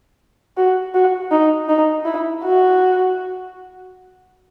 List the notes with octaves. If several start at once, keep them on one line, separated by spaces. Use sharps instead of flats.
F#4
F#4
D#4
D#4
E4
F#4